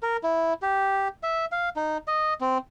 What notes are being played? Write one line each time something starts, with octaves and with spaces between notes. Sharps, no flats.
A#4
E4
G4
E5
F5
D#4
D#5
C4